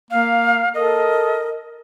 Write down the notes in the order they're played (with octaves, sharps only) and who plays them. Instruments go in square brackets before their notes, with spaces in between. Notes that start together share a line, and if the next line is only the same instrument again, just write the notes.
[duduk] A#3 [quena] F5
[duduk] A4 [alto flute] A#4 [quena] D#5